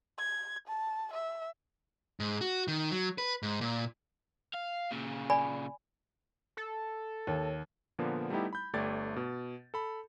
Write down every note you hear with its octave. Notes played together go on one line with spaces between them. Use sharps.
G#6
A5
E5
G#2
F#4
D#3
F#3
B4
G#2
A#2
F5
A#2 C#3
D5 G#5 B5
A4
D#2 C#5
A#2 D3 F3 A#3 B3
G3 A3 B3 D#4 E4 G4
B5 G6
G1 A3 G4 D5 G#6 A6
B2
A4 B5